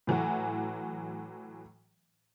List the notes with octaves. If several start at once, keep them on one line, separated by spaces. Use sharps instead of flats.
A2 E3 F#3 F#4